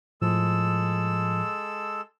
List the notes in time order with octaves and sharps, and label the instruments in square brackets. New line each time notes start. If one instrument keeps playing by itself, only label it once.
[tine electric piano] A2 F3 [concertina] G#3 A4 E6